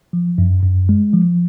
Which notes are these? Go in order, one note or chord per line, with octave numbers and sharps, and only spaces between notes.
F3
F#2
F#2
G#3
F3